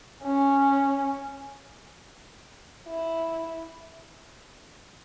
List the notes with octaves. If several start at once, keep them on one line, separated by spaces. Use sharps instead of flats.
C#4
E4